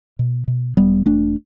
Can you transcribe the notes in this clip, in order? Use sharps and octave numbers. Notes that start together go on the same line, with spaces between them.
B2
B2
E1 G3 B3
E1 A3 D4